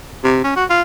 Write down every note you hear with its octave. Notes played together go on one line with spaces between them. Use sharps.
C3
C#4
F#4
F4